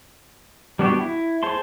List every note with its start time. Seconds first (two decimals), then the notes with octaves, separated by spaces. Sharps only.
0.79 G3 B3 D4 F#4 G4
1.01 E4
1.43 G#4 C5 A5 C6